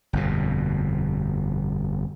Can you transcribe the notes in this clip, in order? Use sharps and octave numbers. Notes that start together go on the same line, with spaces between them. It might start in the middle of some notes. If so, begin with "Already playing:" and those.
G1 F2 B2